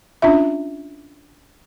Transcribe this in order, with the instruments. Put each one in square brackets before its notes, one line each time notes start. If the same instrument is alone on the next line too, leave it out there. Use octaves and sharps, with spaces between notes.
[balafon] C#4 D4 F4 E5